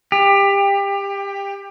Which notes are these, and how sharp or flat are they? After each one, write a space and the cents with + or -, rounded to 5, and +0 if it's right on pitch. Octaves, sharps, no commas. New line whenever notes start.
G4 +25